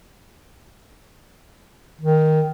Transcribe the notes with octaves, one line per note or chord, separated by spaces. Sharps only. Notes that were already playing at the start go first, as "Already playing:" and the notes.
D#3